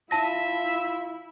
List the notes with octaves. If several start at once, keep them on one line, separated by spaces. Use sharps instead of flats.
E4 F4 E5 A5 A#6